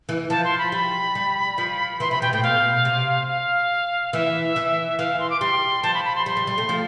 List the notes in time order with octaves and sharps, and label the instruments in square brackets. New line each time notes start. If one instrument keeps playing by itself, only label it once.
[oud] E3
[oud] F3 [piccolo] A5
[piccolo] C6
B5
[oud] G3 [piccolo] B5
[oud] G3
F3
[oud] E3 [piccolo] C6
[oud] C3 [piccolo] B5
[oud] B2 [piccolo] G5
[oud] A2 [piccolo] G5
[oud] B2 [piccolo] F5
[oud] C3
[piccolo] F5
[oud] E3 [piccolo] E5
[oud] E3
[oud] E3 [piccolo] F5
[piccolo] C6
D6
[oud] G3 [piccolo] C6
[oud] F3 [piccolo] A5
[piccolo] B5
B5
C6
[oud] G3 [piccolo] C6
[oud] G3
G3
A3
F3